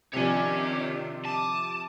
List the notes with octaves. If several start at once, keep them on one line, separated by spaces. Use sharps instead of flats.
C3 D#3 F3 D4 G4 C#5 G#5
A5 D6 D#6